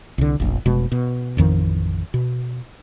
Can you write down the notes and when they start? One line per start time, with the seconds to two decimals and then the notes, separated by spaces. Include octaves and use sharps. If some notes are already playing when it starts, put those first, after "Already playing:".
0.18 C2 D3
0.40 F1 A#1
0.66 F1 B2 G#3
0.92 B2
1.37 A1 F2 D#3 F3
2.14 B2